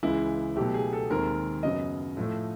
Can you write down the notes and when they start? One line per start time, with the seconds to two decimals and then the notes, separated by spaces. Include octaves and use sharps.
0.03 C#2 C#3 E3 G#3 E4
0.56 B2 F#3 A3 G4
0.74 G#4
0.93 A4
1.10 D#2 D#3 G#3 C4 A#4
1.63 F#2 C#3 F#3 B3 D#5
2.17 A2 F3 A3